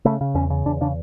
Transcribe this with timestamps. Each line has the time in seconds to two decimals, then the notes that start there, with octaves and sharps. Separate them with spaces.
0.05 C#3 A3
0.21 C#3
0.35 E2 C#4
0.50 C#3
0.66 E2 D4
0.81 C#3 D4